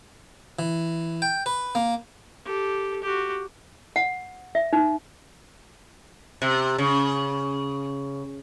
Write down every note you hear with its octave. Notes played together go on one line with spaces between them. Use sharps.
E3
G5
B4
A#3
G4 A4
F#4 G4
F#5
E5
D#4
C3
C#3